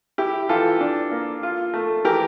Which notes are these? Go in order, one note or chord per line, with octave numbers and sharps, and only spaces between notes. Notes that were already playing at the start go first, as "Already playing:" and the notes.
E4 G4
E3 F4 A4
D4
A#3
F4
A3
E3 G4 A#4